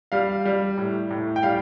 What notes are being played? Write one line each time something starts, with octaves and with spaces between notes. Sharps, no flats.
G3 F5
G3
A2
A2
G5
G3 F5